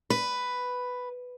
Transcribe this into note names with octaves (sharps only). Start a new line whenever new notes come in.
B4